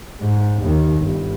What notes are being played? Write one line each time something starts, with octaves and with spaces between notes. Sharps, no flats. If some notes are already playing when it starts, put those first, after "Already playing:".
G#2
D#2 D#3
G1